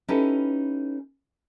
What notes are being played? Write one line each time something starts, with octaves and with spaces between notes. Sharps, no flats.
C#4 D#4 E4 G4 A4 B4